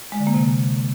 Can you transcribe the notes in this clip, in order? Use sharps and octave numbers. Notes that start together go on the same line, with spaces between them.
G#3
D3
A#3
C3